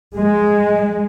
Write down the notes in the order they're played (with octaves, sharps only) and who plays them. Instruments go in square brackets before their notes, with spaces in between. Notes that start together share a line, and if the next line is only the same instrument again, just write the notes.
[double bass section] G#3